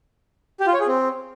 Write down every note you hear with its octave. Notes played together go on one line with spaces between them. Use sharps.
G4
F4
C#5
G#4
C4